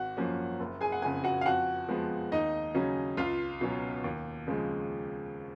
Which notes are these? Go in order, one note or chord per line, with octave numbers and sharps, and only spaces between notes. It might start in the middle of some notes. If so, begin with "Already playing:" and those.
Already playing: G#1 F#4 F#5
F#2 F3 A#3 C#4
F#1
G#4 G#5
F#5
F2 C#3 G#4 G#5
F#4 F#5
F5
F2 F#4 F#5
F3 G#3 B3
D#2 D#4 D#5
C#3 F#3 C#4
C#2 F4 F5
B2 F#3 C#4
D#2
C#3 F3 G#3